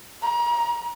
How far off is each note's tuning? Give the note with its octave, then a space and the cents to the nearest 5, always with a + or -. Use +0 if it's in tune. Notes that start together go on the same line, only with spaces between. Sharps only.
A#5 +35